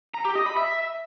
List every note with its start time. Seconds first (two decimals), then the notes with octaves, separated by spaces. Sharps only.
0.14 A#5
0.25 G4
0.35 D#5
0.46 B5
0.57 E5